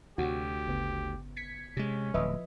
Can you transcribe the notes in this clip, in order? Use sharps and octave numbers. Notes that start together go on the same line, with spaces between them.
D2 C3 F#4 G4
G1 C#3 B3
G#6 B6 C#7
C3 G#3 C#4
D1 F3 B4 D#5 E5